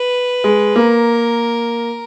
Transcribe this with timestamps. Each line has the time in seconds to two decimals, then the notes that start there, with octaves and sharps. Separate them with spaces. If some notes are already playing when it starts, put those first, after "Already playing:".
Already playing: B4
0.44 G#3
0.75 A#3 A#4